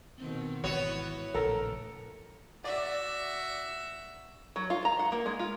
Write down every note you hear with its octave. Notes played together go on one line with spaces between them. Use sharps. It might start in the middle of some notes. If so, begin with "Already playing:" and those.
B2 D#3 C4
G#1 E3 B3 E4 F#4 C#5
A#1 A2 C#3 A4 A#4 A#5
F#4 D5 E5
F#3
F4
A#5
F#5
A#3
G#3
F4